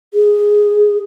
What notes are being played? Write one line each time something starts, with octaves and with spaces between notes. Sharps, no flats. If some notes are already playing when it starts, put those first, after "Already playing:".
G#4